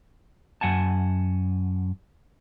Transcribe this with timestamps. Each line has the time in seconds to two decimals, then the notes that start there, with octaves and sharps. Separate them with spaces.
0.61 F#2 F#5 G#5 A5